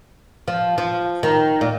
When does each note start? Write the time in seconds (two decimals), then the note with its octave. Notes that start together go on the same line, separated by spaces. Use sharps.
0.48 F3
0.78 F3
1.23 D#3
1.61 A#2